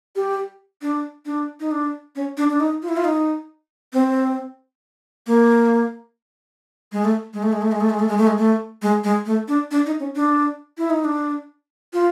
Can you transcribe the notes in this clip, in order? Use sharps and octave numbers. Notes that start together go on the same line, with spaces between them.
G4
D4
D4
D#4
D4
C#4
D4
D4
D#4
F4
E4
F4
D#4
C4
A#3
G#3
A3
G#3
A3
G#3
A3
G#3
A3
G#3
A3
G#3
A3
G#3
A3
G#3
G#3
A3
D4
D4
D#4
C#4
D4
E4
D#4
D4
F4